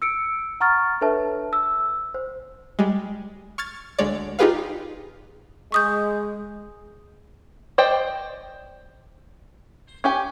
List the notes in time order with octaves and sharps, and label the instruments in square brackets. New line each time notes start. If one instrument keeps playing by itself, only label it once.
[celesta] E6 C#7 D7
F#5 A#5 C#6 F6 A6
D4 A4 B4 C#5 E5 A5
E6
C5
[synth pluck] G3 G#3
C#6 F6 G#6 A6
D2 G#3 C#5 D5
D#4 F4 G4 G#4 B4 F5
[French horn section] G#3 [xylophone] C#6 D#6 G6
[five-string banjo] C5 D5 D#5 G5
C#4 G4 G#5